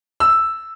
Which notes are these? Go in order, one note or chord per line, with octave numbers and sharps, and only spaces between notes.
E6